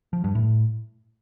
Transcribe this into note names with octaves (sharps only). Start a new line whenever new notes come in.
F3
G2
A2